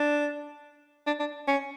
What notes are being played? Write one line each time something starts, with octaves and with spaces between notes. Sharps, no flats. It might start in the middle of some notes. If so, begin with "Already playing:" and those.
Already playing: D4
D4
D4
C#4